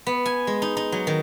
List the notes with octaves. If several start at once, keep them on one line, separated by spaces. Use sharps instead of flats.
B3
G#5
G#3
D#4
D#4
F#3
D#3